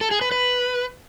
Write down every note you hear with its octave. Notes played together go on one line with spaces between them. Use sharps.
A4
G#4
B4
B4